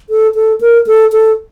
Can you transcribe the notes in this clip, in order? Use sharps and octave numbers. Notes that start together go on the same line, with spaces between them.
A4
A4
A#4
A4
A4